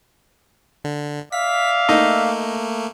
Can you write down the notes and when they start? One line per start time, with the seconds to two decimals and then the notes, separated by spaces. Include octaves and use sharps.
0.84 D3
1.32 D5 E5 F5 B6
1.89 A3 A#3 D#4